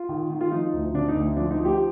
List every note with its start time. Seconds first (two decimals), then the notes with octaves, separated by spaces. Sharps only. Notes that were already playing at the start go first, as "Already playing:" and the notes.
Already playing: F4
0.09 D#3
0.30 D#3
0.41 F4
0.52 F3 D#4
0.73 D2
0.94 D3 D4
1.09 D#4
1.15 D2
1.37 F3 D4
1.51 D#4
1.58 F3
1.65 G4